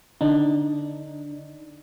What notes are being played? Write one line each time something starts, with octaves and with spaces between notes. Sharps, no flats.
D3 D4 D#4